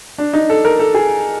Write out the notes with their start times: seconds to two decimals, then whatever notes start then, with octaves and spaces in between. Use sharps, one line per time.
0.18 D4
0.33 D#4
0.50 A4
0.65 A#4
0.79 A4
0.94 G#4